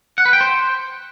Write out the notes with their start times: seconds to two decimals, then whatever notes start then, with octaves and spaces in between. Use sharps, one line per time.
0.18 F#5
0.25 B4
0.33 G5
0.41 C5